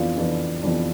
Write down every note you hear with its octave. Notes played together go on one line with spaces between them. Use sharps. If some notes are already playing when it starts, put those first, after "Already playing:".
Already playing: F2 E3 B3 D4 F4
F2 E3 B3 D4
F2 E3 B3 D4